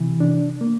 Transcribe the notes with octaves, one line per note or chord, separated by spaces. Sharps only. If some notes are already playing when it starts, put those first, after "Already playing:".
Already playing: C3 E3
D4
A#3